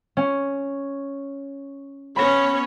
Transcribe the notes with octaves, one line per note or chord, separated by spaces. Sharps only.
C#4
B3 C#4 C#5 B5 A#6